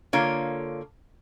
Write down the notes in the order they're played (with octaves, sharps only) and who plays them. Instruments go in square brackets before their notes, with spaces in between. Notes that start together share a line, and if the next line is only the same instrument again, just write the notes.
[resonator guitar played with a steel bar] D3 A#3 F4 C#5